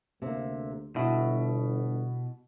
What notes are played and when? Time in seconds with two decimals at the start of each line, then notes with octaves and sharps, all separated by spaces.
0.22 D2 C3 A#3
0.96 G1 B2 E4 F#4